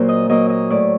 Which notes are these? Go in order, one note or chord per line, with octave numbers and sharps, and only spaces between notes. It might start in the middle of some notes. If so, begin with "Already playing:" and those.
Already playing: A#2 F#3 A#3 C5
D#5
F#3 A#3 D#5
D#5
A2 D5